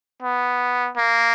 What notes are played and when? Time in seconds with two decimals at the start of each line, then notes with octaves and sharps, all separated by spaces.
0.22 B3
0.97 A#3